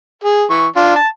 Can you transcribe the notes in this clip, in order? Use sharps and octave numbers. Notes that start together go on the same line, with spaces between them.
G#4
E3 C#6
D4 F4
A5